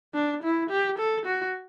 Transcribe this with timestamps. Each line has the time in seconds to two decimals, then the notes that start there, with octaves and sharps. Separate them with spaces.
0.14 D4
0.43 E4
0.70 G4
0.99 A4
1.26 F#4